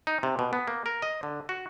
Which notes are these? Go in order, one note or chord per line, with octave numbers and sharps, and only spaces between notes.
D#4
C3
B2
B3
A#3
A#4
D#5
D3
F#4